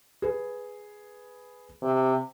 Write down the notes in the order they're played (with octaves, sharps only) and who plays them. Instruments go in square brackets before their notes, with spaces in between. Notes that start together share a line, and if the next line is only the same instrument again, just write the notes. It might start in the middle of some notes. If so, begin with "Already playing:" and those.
[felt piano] G#4 B4
[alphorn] C3